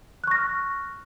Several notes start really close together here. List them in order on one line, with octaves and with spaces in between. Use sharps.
F#6 C#6 A#6 F6